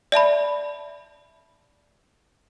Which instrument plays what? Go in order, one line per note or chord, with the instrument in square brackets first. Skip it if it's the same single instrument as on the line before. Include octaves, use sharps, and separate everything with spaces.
[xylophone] D5 E5 A5 B5